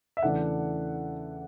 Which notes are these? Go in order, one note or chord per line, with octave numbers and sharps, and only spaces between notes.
E5
E2 C#3 E3 A3 D4 F#5